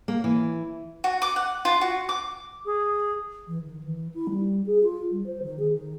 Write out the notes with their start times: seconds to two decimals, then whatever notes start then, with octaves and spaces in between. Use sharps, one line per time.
0.08 A#3
0.24 E3
1.04 F#4
1.22 D6
1.36 F#5
1.65 F4
1.81 F#4
2.09 D6
2.65 G#4
3.48 E3
3.65 D#3
3.83 E3
4.14 E4
4.30 G3
4.66 G#4
4.83 F4
5.11 G3
5.26 C5
5.42 D#3
5.59 G#4
5.72 D#3